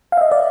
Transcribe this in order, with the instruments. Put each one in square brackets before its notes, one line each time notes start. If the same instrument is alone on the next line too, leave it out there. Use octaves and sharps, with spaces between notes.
[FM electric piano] F5
E5
D#5
D5